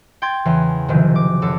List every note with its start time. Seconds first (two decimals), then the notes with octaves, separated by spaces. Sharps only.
0.22 G5 C6 G#6 A6
0.45 E2 C#3 E3
0.88 F#1 C3 D#3 F3
1.16 D6
1.42 F#2 A4